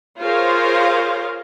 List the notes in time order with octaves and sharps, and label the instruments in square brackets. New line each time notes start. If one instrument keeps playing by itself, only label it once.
[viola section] F4 G#4 A#4 C5 C#5 F5